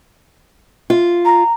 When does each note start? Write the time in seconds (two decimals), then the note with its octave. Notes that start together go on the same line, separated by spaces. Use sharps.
0.90 F4
1.25 A#5